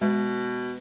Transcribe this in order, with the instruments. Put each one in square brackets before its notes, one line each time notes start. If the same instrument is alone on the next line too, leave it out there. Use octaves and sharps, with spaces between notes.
[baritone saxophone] B2 [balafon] G#3